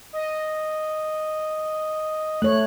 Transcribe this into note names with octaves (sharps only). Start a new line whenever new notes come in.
D#5
A3 C#5 F#6